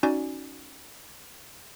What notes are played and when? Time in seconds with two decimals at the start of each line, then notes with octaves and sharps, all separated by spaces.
0.03 C#4 D#4 F#4 D5 G#5